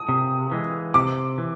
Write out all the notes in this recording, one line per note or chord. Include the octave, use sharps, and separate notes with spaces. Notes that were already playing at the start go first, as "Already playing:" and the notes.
Already playing: D#6
C3
E3 G#3
C3 D6
E3